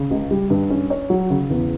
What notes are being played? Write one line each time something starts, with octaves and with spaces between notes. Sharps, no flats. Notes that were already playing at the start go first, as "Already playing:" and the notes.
Already playing: C#3
C#2
G3
G2
C#4
C#5
F#3
C#3
E2